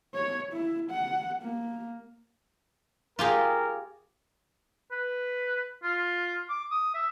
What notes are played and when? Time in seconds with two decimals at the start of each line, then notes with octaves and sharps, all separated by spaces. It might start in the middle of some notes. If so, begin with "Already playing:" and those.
0.14 C#5
0.53 E4
0.90 F#5
1.42 A#3
3.19 F4 G4 G#4 A#4
4.91 B4
5.83 F4
6.50 D6
6.71 D#6
6.94 E5